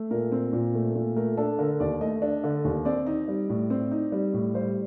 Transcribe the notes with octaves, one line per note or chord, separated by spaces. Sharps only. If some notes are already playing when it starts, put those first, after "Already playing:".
Already playing: A3
A#2 A#4
C4
A#2
A3
A#2
A3 A#4
D4 A4
D3 A#4
D#2 D5
A3 D#5
D4
D3
D#2
C4 D5
D#4
G3
A2
C4
D#4
G3
A2
G3 C5